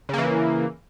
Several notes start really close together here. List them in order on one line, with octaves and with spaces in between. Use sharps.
C#3 A#3 E3